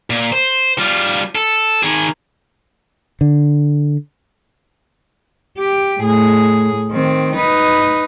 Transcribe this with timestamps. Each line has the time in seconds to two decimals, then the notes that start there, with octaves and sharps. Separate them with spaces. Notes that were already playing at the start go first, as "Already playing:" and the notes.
0.10 A#2
0.33 C5
0.78 G3 F4
1.35 A4
1.83 D#3 G#4
3.21 D3
5.58 G4
6.00 A2 G#4
6.91 D#3 C4
7.36 D#4 B4